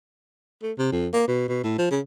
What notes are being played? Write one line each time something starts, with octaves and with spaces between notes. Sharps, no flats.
A3
C3
F2
A#3
B2
B2
A2
F3
C#3